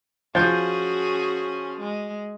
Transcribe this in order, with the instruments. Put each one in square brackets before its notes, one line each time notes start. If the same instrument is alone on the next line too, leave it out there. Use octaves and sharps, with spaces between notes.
[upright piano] F3 G6 [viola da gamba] C#4 F#4 G#4
[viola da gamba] G#3